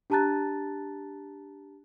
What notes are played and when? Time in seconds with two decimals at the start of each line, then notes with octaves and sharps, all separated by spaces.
0.10 D4 G4 A5 A#5 F#6 A6